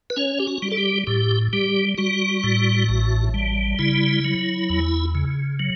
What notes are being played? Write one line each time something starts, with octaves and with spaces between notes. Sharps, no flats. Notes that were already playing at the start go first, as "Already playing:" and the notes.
B4
C#4 C#5
G4
F#4
G3
A4
G4
A2 G4
G3 G4
G3 F#4
A2
A1
G3
C#3 E4
F#3
E2
C#3
F#3